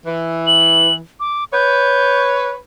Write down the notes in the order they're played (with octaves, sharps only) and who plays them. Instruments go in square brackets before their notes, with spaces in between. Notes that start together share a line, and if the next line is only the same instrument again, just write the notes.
[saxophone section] E3
[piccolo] F#7
D6
[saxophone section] B4 C#5 [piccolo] G6